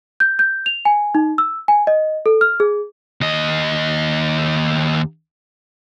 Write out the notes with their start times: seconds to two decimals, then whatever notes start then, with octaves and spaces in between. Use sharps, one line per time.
0.20 G6
0.39 G6
0.66 F7
0.85 G#5
1.15 D#4
1.38 E6
1.68 G#5
1.87 D#5
2.26 A4
2.41 F6
2.60 G#4
3.21 D#2 D#5